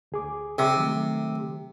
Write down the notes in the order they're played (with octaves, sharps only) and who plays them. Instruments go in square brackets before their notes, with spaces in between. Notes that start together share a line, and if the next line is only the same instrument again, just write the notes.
[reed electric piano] D2 G#4 D6
[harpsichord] C3
[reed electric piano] D#3 F#3 A3